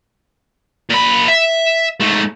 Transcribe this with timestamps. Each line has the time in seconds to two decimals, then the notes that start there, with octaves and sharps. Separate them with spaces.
0.90 A#2 B5
1.28 E5
2.00 G#2 A3